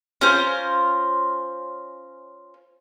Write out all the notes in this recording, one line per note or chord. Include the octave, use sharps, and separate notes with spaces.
C#4 F4 A#4 C5